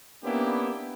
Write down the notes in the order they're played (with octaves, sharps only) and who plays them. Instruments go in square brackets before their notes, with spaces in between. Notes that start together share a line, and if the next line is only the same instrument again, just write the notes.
[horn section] A#3 B3 C#4 D4 E4 G4